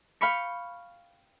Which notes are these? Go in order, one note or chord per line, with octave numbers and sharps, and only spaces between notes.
F5 G5 B5 C#6 C#7